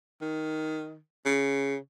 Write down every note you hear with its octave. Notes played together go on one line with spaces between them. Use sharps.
D#3
C#3